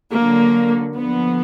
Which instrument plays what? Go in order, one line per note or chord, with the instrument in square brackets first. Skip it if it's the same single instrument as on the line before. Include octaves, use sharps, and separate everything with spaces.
[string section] D3 F#3 A#3
D3 F3 B3